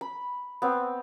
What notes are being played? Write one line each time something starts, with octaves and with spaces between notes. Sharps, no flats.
B5
B3 C4